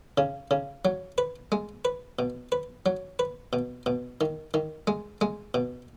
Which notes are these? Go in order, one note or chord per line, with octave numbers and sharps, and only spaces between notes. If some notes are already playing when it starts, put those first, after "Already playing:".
C#3
C#3
F#3
B4
G#3
B4
B2
B4
F#3
B4
B2
B2
D#3
D#3
G#3
G#3
B2